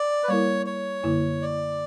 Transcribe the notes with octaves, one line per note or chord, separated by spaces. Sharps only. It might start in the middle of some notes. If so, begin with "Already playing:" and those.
Already playing: D5
B4
G3 A#3 E4 A#4 C#5
C#5
F#2 D3 A#3 E4
D5